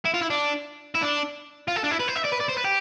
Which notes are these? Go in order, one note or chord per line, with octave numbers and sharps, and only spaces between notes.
E4
F4
E4
D4
E4
D4
F4
A4
D4
E4
B4
C5
E5
D5
B4
D5
C5
B4
G4